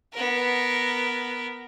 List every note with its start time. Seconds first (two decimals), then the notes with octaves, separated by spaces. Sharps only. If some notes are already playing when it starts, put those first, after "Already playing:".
0.13 B3 A#4